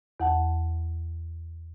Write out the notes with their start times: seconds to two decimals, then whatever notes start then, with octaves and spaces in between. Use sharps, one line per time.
0.20 E2 F#5 A5